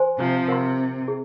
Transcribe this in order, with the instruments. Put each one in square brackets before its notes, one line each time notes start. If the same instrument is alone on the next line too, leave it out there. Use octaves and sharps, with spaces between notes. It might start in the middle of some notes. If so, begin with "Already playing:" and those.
Already playing: [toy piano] C5 G#5 C6
[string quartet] C3 F3
[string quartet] C3 [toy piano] A#4 F5 C6
[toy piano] G#4